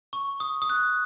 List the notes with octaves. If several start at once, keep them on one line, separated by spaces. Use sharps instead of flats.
C#6
D#6
D#6
F#6